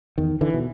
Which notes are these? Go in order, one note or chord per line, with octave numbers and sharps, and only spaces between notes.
E2 D#3
D3 E3
B2